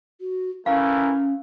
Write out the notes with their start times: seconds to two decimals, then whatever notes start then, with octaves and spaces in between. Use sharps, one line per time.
0.20 F#4
0.66 E3 A3 C#4 A#4 F5